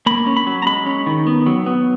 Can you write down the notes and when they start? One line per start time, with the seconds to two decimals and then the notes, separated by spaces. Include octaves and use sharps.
0.06 A#3 B5
0.27 C#4
0.37 B5
0.47 F#3
0.62 A#5
0.66 G#3 B5
0.86 C#4
1.06 D#3
1.27 B3
1.46 F#3
1.66 B3